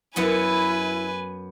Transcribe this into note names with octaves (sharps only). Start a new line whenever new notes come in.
F#2 B3 E4 B4 F#5 G#5